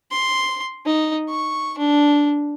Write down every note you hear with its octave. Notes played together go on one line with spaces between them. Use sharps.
C6
D#4
C#6
D4